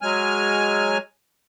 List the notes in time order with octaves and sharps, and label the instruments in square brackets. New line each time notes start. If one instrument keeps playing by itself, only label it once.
[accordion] F#3 G#3 G#5 F6